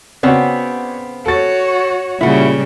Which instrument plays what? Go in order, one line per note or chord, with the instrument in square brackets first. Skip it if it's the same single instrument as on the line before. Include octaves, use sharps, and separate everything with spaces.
[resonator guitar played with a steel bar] C#3 B3 C4 [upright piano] F#4 C#5 D5
[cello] F#4 C#5 [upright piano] A4 A6
[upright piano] A#2 [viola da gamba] C#3 G3 [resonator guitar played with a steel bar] E4 F#4